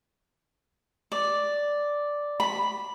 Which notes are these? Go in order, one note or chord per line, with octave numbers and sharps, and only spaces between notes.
D5
B5